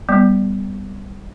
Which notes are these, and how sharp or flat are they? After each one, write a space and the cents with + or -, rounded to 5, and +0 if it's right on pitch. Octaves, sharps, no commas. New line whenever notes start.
G3 +0 B3 +0 D5 +0